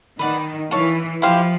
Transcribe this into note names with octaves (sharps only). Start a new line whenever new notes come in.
D#3 B4 D5 F#5
E3 C#5 F5 A5
F3 E4 G4 C5 F5